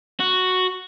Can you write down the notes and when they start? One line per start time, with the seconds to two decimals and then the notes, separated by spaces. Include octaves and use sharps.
0.20 F#4